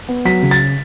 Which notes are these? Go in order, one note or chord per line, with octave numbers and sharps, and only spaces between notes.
B3
F#3 B6
C#3
A6